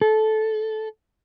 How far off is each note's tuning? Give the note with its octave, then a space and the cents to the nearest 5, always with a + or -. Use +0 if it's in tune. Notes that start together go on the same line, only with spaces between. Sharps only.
A4 -15